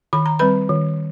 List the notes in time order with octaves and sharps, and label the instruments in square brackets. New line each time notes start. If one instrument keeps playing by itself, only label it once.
[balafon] D#3 B5
A#5
G3 C4 B4 B5
D#3